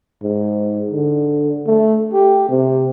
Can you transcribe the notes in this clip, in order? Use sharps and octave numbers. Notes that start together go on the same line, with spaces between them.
G#2
D3
A3
G4
C3